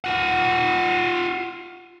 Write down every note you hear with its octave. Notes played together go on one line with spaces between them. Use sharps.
F4 F#5